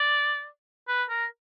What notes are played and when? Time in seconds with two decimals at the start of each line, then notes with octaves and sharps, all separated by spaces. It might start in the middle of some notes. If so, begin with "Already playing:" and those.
Already playing: D5
0.88 B4
1.09 A#4